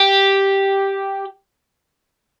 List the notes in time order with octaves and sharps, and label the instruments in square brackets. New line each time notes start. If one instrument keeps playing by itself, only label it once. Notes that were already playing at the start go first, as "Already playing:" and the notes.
Already playing: [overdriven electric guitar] G4